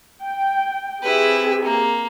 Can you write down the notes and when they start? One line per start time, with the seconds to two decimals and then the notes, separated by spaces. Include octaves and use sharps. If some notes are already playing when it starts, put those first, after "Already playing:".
0.23 G5
1.03 C4 E4 G4 G#4 B4
1.64 A#3